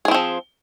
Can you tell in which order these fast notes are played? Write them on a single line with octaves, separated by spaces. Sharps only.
G#4 E3 C4 F3